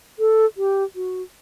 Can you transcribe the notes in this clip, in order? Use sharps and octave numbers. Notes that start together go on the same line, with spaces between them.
A4
G4
F#4